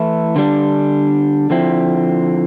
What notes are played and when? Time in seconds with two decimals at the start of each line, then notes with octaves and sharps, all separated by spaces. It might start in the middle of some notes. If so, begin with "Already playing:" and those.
Already playing: E3 A3 E4
0.36 D3 G3 D4
1.50 D3 F3 C4 E4